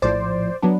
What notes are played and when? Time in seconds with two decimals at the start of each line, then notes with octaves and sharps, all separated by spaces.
0.02 A#1 A2 F3 C5 D5
0.62 F#3 B3 D4